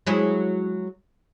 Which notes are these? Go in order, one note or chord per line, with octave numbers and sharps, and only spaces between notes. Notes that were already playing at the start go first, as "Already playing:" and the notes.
F#3 G#3 E4